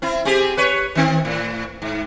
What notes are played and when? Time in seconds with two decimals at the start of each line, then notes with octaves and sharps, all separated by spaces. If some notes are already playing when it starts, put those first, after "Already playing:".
0.02 C4 E4
0.25 C4 G4 G#4
0.57 B4 C#5
0.95 D#3 C4
1.25 A2
1.82 G#2